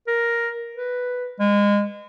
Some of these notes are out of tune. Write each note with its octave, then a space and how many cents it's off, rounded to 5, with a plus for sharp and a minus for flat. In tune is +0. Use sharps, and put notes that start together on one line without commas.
A#4 +5
B4 +0
G#3 -25